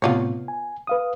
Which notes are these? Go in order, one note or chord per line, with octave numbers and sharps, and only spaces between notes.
A2 C3 B3 F4 C#5
G#5
B4 F5 D#6